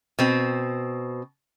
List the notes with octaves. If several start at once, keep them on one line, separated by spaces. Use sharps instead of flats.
B2 C4